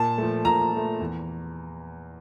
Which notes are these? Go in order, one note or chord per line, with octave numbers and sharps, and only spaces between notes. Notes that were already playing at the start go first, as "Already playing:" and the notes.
Already playing: A#2 A5
F3 A3
A#2 A#5
F3 A3
E2